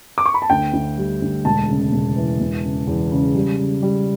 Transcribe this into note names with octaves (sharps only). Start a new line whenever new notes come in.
D6
C#6
B5
A5
D2 G5
D2
G3
D2
E1 A5
C#3
E1
E3
E1
C#3
E2
C#3
G3
C#3
G3